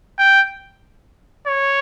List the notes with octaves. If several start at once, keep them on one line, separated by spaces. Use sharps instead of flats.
G5
C#5